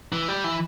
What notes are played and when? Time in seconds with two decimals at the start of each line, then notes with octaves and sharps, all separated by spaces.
0.13 E3
0.28 G3
0.44 E3